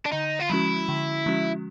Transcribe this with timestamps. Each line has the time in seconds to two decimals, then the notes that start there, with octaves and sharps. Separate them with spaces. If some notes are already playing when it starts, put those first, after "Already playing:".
0.06 D4
0.12 D3 D#4
0.40 F4
0.50 F3 G#3 C#4 E4 F#4
0.89 D3
1.26 F3 G#3 C#4 F#4